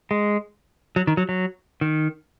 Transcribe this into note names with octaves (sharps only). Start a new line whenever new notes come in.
G#3
F#3
D#3
F#3
F#3
D#3